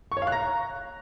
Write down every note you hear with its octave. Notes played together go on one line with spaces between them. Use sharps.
C#6
C#5
F5
F#6
A#5